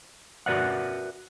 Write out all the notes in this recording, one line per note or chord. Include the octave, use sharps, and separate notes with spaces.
F#4 A#4 B4 D5 E5 F#5